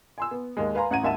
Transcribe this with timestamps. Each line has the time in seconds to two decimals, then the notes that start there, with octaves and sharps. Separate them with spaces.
0.18 G#5 C6 E6
0.31 B3
0.57 D#2 G#3
0.75 B4 F5 G#5 A#5 C6
0.91 A1 F#5 A#5 G#6 D#7
1.03 G#1 D#2 E5 F#5 A5 E7